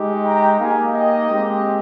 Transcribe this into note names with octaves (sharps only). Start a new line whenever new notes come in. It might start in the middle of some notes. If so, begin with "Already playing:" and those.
Already playing: G#3 D#4 G4
G5 A#5
A#3 D#4 G4 F5 G#5
D#5 G5
G#3 C4 G4